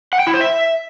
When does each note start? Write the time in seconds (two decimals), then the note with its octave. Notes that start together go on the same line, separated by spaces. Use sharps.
0.13 F#5
0.20 G5
0.27 E4
0.34 C5
0.41 E5